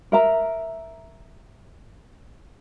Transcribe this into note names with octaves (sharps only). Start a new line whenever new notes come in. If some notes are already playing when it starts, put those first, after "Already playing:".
A#4 E5 A#5